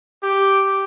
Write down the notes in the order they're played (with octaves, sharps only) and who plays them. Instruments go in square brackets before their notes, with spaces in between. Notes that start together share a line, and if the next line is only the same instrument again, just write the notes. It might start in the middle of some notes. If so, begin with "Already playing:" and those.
[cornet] G4